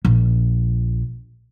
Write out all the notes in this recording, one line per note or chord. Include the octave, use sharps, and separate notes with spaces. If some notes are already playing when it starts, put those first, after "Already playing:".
A#1